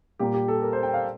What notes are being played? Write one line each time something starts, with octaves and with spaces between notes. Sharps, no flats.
A#2 G3 A#3 G4
G4
A4
A#4
C5
G5
F5